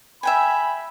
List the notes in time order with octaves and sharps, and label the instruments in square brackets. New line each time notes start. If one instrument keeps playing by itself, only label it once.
[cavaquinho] E5 G5 G#5 [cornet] B5